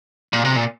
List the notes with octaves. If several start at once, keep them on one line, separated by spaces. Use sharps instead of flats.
A#2
C3
A#2